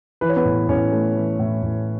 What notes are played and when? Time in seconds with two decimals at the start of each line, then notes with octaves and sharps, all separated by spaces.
0.21 E3 B4
0.29 C#5
0.36 B3 B4
0.45 A2
0.68 A2 C#4 C#5
0.92 A3
1.16 E3
1.39 A2
1.63 A2